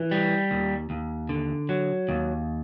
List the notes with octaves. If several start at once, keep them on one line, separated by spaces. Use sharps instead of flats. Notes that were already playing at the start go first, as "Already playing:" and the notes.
Already playing: E3
G3
D#2
D#2
D3
F#3
D#2